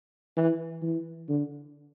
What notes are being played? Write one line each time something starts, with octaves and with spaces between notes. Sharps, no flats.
E3
E3
D3